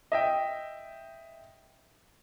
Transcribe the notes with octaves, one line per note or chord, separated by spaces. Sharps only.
D#5 E5 G5